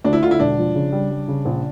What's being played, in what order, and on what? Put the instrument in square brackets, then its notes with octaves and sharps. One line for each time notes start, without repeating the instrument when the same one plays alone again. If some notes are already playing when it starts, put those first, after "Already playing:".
[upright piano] D2 [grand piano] D4
[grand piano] E4
[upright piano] D3 [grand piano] F4
[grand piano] E4
[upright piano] E1 [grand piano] D4
[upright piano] F3
C#3
G3
G3
C#3
A#1